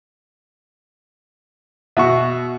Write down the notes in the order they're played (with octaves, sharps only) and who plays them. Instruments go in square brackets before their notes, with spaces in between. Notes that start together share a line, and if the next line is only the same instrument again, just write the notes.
[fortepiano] B2 F#4 [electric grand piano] E5 C#6